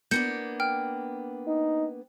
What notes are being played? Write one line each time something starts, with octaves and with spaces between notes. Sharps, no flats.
A#3 B3 D4 G6 C#7
G5 F6
D#4